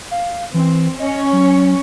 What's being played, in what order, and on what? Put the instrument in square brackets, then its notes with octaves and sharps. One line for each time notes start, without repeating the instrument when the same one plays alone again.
[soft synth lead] F5
[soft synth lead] E3 [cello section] C4
[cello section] C#4 C#5 [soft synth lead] D#5
[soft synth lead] F#3